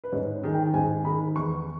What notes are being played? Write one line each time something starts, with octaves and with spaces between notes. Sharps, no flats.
B4
G#2 C#5
D#3 G#3
G5
G#2 G#5
D#3 G#3 B5
E2 C#6